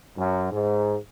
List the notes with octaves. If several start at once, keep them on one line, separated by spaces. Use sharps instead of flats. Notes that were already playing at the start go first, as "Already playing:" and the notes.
F#2
G#2